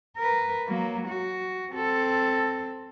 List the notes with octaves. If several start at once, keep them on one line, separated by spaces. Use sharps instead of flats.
A#4 B4
F#3 A#3
F#4
C4 A4